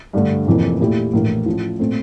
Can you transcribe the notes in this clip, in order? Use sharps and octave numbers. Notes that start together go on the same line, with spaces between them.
G2 D3 A3
F1 F2 E3 A#3
A#2 A3 E4 G4
A#1 A2 E3 A#3
A1 A2 F3
A#2 A3 C4